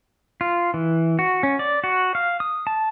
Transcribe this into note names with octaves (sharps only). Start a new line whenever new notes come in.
F4
E3
F#4
C#4
D5
F#4
F5
D#6
A5